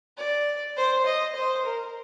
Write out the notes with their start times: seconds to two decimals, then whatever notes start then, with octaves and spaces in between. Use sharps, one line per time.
0.17 D5
0.76 C5
1.06 D#5
1.35 C5
1.65 A#4